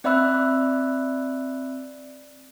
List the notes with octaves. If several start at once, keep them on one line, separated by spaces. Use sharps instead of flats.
C4 D5 E5 B5 E6 F#6